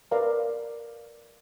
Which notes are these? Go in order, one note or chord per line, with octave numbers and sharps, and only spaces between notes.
A#4 B4 D5 F5 A#5